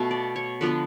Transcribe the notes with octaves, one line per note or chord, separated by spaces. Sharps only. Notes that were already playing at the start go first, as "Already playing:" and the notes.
Already playing: B2 A3 F5
D5
C#5
D3 F3 B3 D4 B4